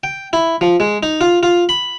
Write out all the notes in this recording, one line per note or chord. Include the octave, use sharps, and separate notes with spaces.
G5
E4
F3
G#3
D#4
F4
F4
B5